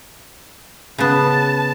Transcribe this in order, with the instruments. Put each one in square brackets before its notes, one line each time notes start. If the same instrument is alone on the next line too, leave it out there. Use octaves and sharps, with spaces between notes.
[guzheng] C#3 B3 [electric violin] A5